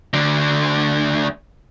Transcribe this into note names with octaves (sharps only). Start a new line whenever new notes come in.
D2 D3